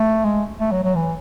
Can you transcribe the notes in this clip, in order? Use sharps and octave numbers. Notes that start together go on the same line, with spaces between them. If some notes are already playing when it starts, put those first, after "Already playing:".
Already playing: A3
G#3
A3
F#3
F#3
E3